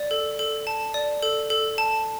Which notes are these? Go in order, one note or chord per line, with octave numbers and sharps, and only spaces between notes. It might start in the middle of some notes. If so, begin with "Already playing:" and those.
Already playing: D5
A4
A4
A5
D5
A4
A4
A5